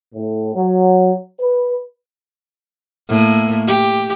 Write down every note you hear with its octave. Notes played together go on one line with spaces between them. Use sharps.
A2
F#3
B4
A2 A#3
G4